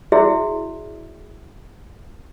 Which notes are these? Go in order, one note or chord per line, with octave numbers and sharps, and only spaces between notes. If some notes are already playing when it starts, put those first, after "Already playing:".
E4 F#4 G#4 D5 E5